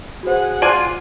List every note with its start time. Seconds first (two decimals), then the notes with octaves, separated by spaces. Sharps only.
0.23 F#4 G#4 C5 F#5
0.62 F4 D5 G#5